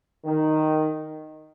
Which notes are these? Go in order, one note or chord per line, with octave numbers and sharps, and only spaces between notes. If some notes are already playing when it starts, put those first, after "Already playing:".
D#3